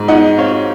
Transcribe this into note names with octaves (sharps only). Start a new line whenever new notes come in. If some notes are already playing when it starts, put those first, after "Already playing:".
Already playing: G#2
D#4 D#5 F#5
C4 C#5 F5